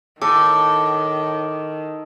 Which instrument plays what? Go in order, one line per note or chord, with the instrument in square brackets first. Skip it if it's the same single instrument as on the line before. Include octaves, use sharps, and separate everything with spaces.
[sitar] A2 [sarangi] D#3 [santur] A4 [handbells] D6